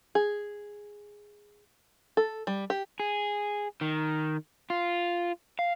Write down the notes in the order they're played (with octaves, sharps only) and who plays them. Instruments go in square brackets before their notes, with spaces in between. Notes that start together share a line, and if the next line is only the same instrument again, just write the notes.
[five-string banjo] G#4
A4
G3
G4
[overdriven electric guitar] G#4
D#3
F4
F5